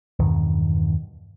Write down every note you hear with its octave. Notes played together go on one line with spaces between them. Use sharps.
E2 G2 B2 D#3